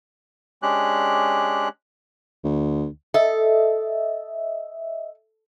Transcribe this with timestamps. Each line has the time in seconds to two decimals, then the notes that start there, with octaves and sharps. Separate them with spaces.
0.62 G#3 C#4 D4 G4 F#6
2.44 D2
3.14 A4 D#5 E5